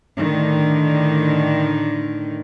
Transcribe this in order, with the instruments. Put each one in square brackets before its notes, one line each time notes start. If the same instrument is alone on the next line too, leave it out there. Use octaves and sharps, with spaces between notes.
[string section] A2 D3 D#3